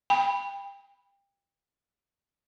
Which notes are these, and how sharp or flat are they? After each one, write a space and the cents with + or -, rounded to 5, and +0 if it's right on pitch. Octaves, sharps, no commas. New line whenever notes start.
G5 +25 B5 +0